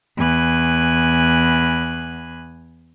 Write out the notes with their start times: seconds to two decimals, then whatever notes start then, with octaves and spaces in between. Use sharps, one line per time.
0.18 E2 G#5 F#6